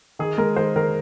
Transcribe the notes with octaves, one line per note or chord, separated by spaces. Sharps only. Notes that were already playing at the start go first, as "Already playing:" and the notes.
D#3 G#4
G#3 A#4
D#3 C5
D#3 A#4